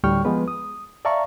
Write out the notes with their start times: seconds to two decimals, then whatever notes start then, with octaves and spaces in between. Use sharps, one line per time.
0.04 D2 A2 G3 G5 C#6 F6
0.25 F3 G#3 B3 B4
0.48 D#6
1.05 D5 E5 F5 A5 A#5 C#6